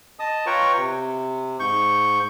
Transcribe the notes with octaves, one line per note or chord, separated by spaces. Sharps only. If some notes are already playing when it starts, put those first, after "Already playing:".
D#5 A5 D#6
F4 B4 C#5 G5 A#5 C#6
C3
G#2 C#6 G6